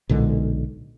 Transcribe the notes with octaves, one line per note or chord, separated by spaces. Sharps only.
B1 A#2 D3 G#3